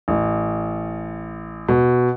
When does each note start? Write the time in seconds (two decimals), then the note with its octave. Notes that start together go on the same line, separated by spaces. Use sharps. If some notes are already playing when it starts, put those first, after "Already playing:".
0.08 A1
1.69 B2